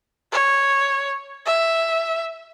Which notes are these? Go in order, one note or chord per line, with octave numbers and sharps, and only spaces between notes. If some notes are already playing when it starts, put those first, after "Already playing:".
C#5
E5